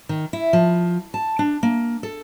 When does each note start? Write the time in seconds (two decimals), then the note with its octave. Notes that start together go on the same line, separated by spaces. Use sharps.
0.09 D#3
0.33 E4
0.53 F3
1.14 A5
1.39 D4
1.63 A#3
2.03 A4